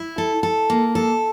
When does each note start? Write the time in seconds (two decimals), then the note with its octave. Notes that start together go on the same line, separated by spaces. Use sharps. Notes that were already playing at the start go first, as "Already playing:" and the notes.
Already playing: E4
0.18 A4
0.43 A4
0.70 A#3
0.95 A4